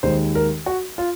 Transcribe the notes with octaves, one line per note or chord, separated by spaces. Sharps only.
D#2 D#3 G#3 C5
A#4
F#4
F4